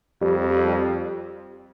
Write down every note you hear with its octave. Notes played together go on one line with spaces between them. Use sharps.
F2 G3
G3
G3
G3